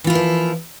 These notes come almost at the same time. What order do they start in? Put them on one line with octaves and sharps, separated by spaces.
E3 F4 E4 A#3 F3